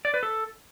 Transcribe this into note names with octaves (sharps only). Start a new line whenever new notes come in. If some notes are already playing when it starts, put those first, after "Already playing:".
D5
B4
A4